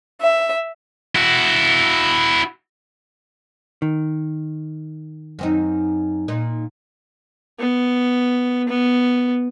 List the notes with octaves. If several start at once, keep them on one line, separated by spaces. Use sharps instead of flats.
E5
E4 F#4
D#3
F#2 C4 D#4
A#2 D#4
B3
B3